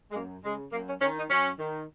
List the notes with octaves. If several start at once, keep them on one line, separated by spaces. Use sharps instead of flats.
G#3
F#2 A#3
C#3 G#3
F#2 A#3
C#4
D#3 C#4
D#4
F#2 C#4
D#3